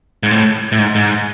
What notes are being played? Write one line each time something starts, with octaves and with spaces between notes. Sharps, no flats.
G#2
A2
A2
G#2
G#2